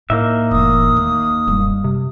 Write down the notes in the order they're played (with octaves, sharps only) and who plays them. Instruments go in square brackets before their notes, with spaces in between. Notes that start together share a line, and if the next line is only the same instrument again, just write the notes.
[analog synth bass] A2 [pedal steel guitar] A#3 D#4 E5 [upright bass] E4
[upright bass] F1 E3 [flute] D#6
[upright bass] D#2
[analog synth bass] D#1 [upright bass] F#2 G3
[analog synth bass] C3